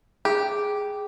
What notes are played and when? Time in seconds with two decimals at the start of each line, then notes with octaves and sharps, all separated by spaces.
0.25 G4 G#4